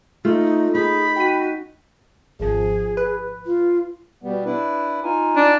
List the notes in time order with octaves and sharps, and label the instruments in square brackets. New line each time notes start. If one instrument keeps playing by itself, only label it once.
[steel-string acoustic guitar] A3 [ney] D#4 [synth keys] F4
[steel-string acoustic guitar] D#4 [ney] G#4 [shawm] B5
[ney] F#4 [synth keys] G5 B6 D#7
[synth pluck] G#1 F3 [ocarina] G#4
[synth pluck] B4
[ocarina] F4
[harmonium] B2 G3 B3
D4 E4 B4
D#4 F4 G#5
[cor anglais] D4